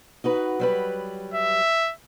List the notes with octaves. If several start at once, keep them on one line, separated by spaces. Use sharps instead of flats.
D#4 F#4 B4
F#3 G3 B4
E5